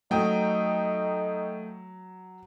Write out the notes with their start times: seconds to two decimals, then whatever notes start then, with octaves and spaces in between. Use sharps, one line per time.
0.11 F#3 A3 D#4 G5 D#6